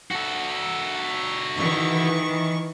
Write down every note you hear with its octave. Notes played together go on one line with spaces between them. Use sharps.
F#4 A4
D#3 E3 C#6